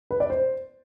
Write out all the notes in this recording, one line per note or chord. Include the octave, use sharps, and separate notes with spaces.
B4
D5
C5